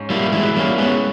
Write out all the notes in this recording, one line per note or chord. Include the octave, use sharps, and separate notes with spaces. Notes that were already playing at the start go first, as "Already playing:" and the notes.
Already playing: G#2 C#4
G3 A#3 E4
E3 G#3 E4
G3 A#3 C#4
G#3 B3 C#4